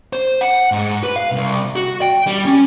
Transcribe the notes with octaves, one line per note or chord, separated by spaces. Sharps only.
C5
F#5
G#2
B4
F5
C2
F#4
G5
G3
C#4